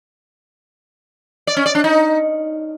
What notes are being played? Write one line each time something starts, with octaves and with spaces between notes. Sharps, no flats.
D5
C#4
D5
D4
D#4